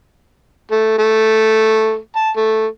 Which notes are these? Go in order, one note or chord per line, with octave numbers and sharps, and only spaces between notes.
A3
A3
A5
A3